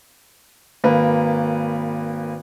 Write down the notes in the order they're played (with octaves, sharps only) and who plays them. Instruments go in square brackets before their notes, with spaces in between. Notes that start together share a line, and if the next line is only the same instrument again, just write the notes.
[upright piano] G#1 A#3 B4